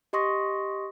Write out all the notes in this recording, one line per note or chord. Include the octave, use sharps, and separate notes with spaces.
G4 D#5 C6 C#6 D#6 A#6